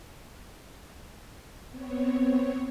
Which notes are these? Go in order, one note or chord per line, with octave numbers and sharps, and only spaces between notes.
B3 C4 C#5